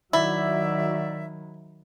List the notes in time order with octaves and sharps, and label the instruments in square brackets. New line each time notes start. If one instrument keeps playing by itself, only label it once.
[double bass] D#3 F#3 [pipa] E4 [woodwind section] F#4 D5 E5